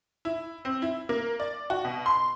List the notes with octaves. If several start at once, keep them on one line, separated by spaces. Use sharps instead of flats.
E4
C4
E4
A#3
D5
F#4
B2
C6